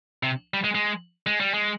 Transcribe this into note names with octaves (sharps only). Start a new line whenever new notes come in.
C3
G3
G#3
G#3
G#3
G3
G#3